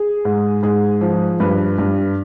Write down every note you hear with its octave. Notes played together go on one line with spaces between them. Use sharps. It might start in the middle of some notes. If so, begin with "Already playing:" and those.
Already playing: G#4
G#2
G#2 G#4
F3
G2 B4
G2